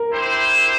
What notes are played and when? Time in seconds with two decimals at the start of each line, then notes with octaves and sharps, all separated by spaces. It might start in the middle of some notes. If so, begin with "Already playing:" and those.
Already playing: A#4
0.10 E4 G4 C5